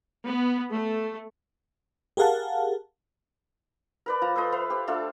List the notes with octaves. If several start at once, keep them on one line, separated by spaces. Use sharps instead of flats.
B3
A3
G4 G#4 A#4 F5 F#5 A5
A#4 B4 D5
F3 A5 A#5
A4 B4 C5 D#5
B4 E5 F5
G4 C5
A3 D4 F4 A4